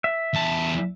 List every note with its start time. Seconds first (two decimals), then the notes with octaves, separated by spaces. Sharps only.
0.04 E5
0.34 E2 A5